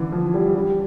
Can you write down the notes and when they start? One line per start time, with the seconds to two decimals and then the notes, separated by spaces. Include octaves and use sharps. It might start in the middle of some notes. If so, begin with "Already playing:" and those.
Already playing: D3 E3
0.12 F3
0.34 G3
0.54 G3